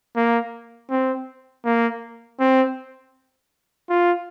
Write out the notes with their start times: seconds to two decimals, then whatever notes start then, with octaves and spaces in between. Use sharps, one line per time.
0.16 A#3
0.90 C4
1.65 A#3
2.40 C4
3.89 F4